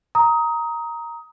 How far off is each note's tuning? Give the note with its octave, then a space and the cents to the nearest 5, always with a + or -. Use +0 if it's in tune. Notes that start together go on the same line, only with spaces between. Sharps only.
A#5 +0 D#6 +20